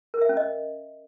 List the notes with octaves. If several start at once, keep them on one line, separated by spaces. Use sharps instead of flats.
A#4
E5
C#4
D#5